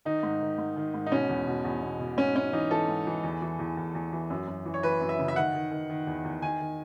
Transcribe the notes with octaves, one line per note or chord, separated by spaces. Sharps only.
D#3 D#4
G#2
D#3
G#2
D#3
G#2
D#4
B2 C#4
E2
B2
E2
B2
B2
G#2 C#4
G#2 C#4
E3 D#4
E3 A4
G#2
E3
E2
E3
E2
E2
E2
E3
F#2
F#2
E3
C#5
E3 B4
F#2
E5
C#3
E5
D#3 F#5
D#3
D#3
D#3
E2
E2
D#3 G#5
D#3